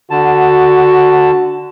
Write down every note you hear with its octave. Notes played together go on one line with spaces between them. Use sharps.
D3 F#4 A5